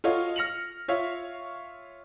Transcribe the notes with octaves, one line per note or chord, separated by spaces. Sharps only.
F4 F#4 A4 C#5 D#5 F5
F6 A#6 C#7 F7 F#7
F4 C#5 E5 F5